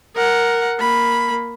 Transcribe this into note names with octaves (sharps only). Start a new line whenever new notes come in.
A#4 F#5
A#3 B5